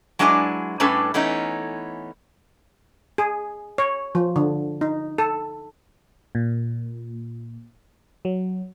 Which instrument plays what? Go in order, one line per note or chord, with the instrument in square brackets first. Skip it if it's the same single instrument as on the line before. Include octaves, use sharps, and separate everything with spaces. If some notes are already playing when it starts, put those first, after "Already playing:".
[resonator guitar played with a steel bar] F#3 G#3 D4 E4 B4 G#5
A2 G3 C#4 D4 A4 B4
E3 A3 B3 C#4 D#4
[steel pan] G#4
C#5
F3
D3
D#4
A4
[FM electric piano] A#2
F#3